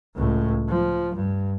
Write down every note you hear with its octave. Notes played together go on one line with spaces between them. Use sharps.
C#2 A2
F3
G2